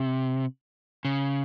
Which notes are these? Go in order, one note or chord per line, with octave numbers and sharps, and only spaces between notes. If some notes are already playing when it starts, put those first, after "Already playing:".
Already playing: C3
C#3